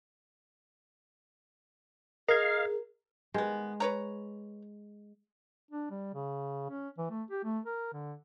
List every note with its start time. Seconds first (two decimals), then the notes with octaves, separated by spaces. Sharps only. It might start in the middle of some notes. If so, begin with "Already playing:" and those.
2.28 G#4 A#4 D#5 F5 G#6
3.34 D#3 G#3 B3
3.80 B4 C#5 A#5
5.71 D4
5.91 G3
6.14 C#3
6.70 C#4
6.98 E3
7.10 A3
7.30 G4
7.44 A3
7.66 A#4
7.93 D3